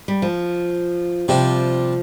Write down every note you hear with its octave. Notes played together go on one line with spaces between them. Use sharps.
G3
F3
C3 F3 G3 D4